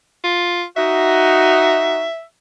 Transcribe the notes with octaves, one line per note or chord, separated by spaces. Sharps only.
F4
D#4 F#4 E5